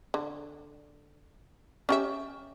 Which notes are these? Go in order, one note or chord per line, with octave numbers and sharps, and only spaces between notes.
D3
C#4 G4 E5